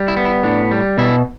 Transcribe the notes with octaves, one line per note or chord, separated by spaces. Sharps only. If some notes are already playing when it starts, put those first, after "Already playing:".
Already playing: G3
E4
B3
E4
A2 D4
G3
B2 E4